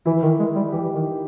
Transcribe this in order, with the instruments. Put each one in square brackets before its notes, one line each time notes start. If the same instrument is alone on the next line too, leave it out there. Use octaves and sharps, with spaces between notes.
[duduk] E3 [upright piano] E4
[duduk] D#3
G#3
G3
[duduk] E3 [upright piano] G4
[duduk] D#3 [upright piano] D#4